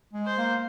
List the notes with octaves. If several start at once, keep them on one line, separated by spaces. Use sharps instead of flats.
G#3
C5
A#3